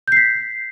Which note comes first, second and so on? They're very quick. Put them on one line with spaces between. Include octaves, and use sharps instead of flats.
G6 C7 B6